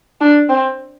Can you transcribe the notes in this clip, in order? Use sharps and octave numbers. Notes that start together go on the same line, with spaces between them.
D4
C4